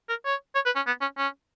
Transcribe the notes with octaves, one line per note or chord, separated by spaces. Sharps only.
A#4
C#5
C#5
B4
C#4
B3
C#4
C#4